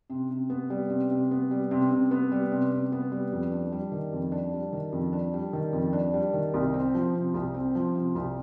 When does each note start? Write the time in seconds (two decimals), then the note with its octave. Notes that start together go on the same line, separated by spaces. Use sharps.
0.10 C3
0.30 C3
0.50 B3
0.70 G3
0.90 C3
1.10 C3
1.31 B3
1.51 G3
1.71 C3
1.91 C3
2.11 B3
2.32 G3
2.52 C3
2.72 C3
2.92 B3
3.12 G3
3.32 F2
3.52 D4
3.72 G3
3.92 D#3
4.13 F2
4.32 D4
4.53 G3
4.73 D#3
4.92 F2
5.13 D4
5.34 G3
5.53 D#3
5.73 F2
5.93 D4
6.14 G3
6.33 D#3
6.54 C2
6.74 C4
6.95 F3
7.15 C3
7.34 C2
7.54 C4
7.75 F3
7.95 C3
8.15 C2